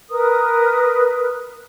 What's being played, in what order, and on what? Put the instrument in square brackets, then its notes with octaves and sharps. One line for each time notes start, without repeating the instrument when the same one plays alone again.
[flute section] A#4 B4 D#6